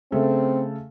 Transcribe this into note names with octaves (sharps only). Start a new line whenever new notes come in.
C#3 A3 C4 A4